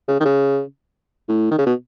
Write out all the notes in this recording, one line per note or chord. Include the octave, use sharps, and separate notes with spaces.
C#3
D#3
C#3
A2
D#3
C#3
B2